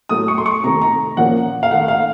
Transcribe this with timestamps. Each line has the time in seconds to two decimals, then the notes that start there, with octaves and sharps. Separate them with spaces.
0.09 A2 F#3 A3 D#6
0.28 C#6
0.38 C6
0.46 C#6
0.63 C3 D#3 A3 A#5
0.82 A#5
1.16 A#2 F3 A#3 C#4 F#5
1.63 F5
1.71 D#3 A3 D#4 F#5
1.88 F5